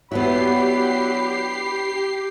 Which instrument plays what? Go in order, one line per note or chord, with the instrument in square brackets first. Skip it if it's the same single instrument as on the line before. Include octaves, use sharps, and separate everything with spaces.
[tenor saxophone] F#3 [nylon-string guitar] B3 D4 E4 [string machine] G4 C7 [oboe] B5